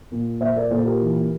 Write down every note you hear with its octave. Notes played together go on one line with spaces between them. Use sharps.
A#2
A#2 C5 E5
A#4 D5
A#2 A4 C5
G4 A#4
E3